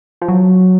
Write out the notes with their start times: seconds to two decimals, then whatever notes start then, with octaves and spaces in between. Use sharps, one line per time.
0.22 F3
0.28 F#3